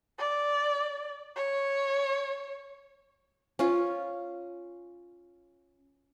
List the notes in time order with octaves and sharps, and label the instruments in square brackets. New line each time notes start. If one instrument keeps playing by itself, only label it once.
[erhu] D5
C#5
[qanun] C#4 F4